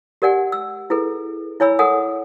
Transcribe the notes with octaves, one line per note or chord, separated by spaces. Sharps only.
G4 A#4 D5 F#5 G#5
E6
E4 G#4 A4 B4
E4 C#5 G#5 B5 E6
A4 A#4 F#5 G#5 D#6